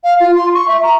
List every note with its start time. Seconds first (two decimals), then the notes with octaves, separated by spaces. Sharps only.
0.03 F5
0.20 F4
0.35 C6
0.54 C#6
0.67 E5
0.82 A#5